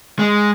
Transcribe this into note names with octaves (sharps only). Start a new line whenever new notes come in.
G#3